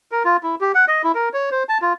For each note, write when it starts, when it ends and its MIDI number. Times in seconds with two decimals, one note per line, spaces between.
0.12 0.23 70
0.25 0.37 65
0.43 0.55 64
0.61 0.72 67
0.75 0.85 78
0.88 1.02 75
1.04 1.12 64
1.15 1.29 70
1.34 1.50 73
1.51 1.63 72
1.69 1.78 81
1.82 1.93 65